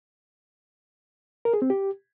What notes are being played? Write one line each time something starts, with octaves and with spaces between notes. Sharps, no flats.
A#4
G#4
C4
G4